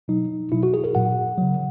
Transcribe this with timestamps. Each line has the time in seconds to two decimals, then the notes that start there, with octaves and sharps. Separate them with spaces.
0.08 B2 F#3 D#4
0.52 B2 F#3 E4
0.63 F#4
0.74 G#4
0.84 A#4
0.95 A#2 F#3 F#5
1.38 C#3 F#3